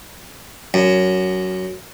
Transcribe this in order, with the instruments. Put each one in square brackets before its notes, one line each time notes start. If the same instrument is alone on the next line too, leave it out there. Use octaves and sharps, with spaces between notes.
[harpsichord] F#2